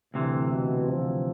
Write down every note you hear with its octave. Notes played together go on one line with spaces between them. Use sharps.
D2 A2 C3 E3
B2
F3